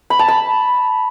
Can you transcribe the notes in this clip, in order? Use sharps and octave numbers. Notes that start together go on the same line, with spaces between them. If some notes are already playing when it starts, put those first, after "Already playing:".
B5
A5
B5